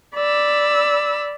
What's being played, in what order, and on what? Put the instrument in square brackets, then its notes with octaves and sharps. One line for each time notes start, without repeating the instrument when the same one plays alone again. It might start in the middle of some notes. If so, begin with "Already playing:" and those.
[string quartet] D5 B5 E6